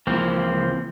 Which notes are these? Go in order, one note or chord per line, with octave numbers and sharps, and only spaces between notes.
C#2 E3 F3 A#3 C4